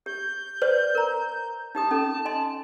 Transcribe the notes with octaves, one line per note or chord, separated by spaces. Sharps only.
G4 G6
B4 C5 D5
A#4 A#5
D#4 G4 A5 D#6
C#4 D#4 A4
D#5 G#5 C6